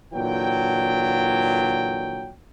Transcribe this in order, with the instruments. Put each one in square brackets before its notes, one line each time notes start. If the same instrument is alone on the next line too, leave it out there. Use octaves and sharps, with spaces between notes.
[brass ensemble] A#2 D3 E3 F#3 G5